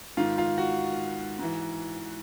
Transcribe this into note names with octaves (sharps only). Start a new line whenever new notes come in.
G#2 D#3 F4
F4
F#4
G#2 E3